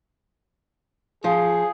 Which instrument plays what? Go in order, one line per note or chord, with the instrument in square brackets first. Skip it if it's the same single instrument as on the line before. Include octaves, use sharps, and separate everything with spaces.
[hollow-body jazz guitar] F3 [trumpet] G#4